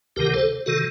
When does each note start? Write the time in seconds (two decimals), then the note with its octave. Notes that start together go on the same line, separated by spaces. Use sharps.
0.16 D2 C3 D#3 G4 A#4
0.34 A4 C5
0.66 C3 D#3 F#4 A4